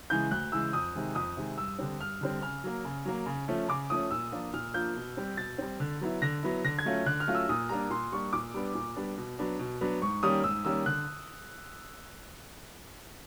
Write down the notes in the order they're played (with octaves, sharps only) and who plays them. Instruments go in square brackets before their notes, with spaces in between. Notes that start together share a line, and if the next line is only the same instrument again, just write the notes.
[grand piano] C#3 E3 G#3 G6
D2 F#6
C#3 E3 G#3 E6
F2 D#6
C3 D#3 G#3
F2 D#6
C3 D#3 G#3
G2 E6
D3 G3 C4
G2 F6
D3 G3 C4
C#3 F6
F#3 A#3
C#3
F#3 A#3
C#3
F3 A3 C#4
C#3 D6
F3 A3 C#4 D#6
A#2 E6
F3 A#3 D4 F4
A#2 F6
F3 A#3 D4 F4 G6
B2
G3 C4
B2 A6
G3 C4
D3
F#3 B3 E4
D3 A#6
F#3 B3 E4
D3 A#6
G#6
F#3 A3 C#4 F4
D3 F#6
F6
F#3 A3 C#4 F4
E6
A#2 D#6
G3 A#3 D4 A#5
A#2 C6
G3 A#3 D4 C#6
A#2 D6
G3 B3 D4
A#2
G3 B3 D4
B2
F#3 B3 D4
B2
F#3 B3 D4
G#2 C#6
D#3 G3 A#3 C#4 D#6
G#2 E6
D#3 G3 A#3 C#4 E6
D3 F#6